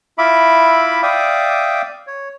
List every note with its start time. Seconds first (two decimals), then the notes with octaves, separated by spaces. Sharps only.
0.18 E4 F4 E5 B5 D6
1.03 D5 E5 F5 G5 D6 D#6
2.07 C#5